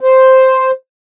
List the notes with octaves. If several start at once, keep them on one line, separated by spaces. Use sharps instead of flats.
C5